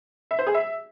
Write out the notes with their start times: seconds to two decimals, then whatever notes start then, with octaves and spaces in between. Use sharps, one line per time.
0.31 E5
0.39 C5
0.47 G#4
0.54 E5